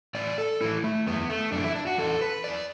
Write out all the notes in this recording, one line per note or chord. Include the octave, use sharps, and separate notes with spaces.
A2 E3 D5
A4
A2 E3 E4
A3
F#2 E3 B3
A3
F#2 E3 D4
E4
D4
F#4
E2 E3 A4
B4
E2 E3 D5